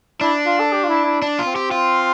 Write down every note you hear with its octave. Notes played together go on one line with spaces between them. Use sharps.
D4 E4
F4
A4
G4
F4
E4
E4
D4
F4
C4
G4
F4